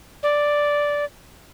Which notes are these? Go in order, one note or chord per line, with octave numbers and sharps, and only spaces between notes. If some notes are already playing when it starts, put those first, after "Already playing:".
D5